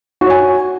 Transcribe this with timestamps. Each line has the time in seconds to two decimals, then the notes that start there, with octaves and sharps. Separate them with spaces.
0.21 F#4
0.26 C#5
0.30 G#5